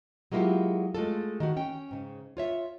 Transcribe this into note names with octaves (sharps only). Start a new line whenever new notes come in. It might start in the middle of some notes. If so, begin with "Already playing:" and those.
F#3 G#3 A#3 E4 F4 G4
G#3 A3 F4 A4
D#3 F#4
C#4 G5
G#2 C#3
F4 C#5 E5